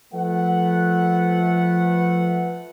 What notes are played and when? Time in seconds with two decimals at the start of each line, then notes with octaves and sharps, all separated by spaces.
0.13 F3 A3 B4 F#5